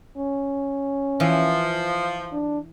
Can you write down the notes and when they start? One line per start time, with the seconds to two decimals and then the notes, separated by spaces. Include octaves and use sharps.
0.17 C#4
1.20 E3 F3
2.32 D4